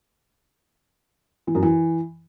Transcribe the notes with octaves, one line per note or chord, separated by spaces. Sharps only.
E3
F#2
E3